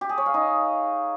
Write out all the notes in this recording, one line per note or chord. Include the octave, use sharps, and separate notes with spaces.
G4
G#4
C#5
F5
D#4